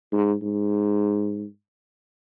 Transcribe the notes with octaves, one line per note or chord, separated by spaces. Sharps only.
G#2
G#2